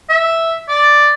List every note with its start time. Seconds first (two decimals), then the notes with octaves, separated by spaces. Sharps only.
0.09 E5
0.69 D5